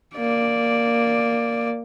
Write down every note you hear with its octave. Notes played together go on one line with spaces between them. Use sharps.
A#3 D5